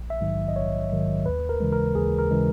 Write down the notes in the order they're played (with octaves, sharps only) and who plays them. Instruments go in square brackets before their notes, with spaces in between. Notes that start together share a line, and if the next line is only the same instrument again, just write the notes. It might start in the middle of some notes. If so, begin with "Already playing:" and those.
Already playing: [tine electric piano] A#1
E5
G#2 D#3 F#3
D#5
A#1 C#5
G#2 D#3 F#3
D#2 B4
A#4
C#3 E3 G#3
A#4
D#2 G#4
A#4
C#3 E3 G#3